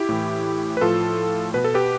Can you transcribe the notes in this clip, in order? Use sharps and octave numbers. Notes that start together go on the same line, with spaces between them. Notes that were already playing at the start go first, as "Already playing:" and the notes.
Already playing: E4 G4
A2 E3
B4
A2 F3 F4 A4
B2 B4
A4
G4 B4